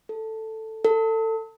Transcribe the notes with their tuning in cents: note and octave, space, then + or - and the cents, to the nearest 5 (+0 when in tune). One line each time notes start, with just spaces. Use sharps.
A4 +5
A4 +25